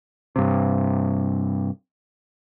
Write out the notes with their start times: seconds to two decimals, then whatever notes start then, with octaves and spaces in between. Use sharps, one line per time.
0.36 G2 C3